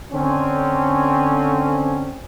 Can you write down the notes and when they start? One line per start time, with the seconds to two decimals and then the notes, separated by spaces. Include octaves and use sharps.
0.13 D3 C4 C#4